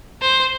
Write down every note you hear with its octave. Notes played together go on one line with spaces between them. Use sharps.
C5